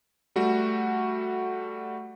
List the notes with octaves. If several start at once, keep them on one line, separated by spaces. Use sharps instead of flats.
G3 A3 F#4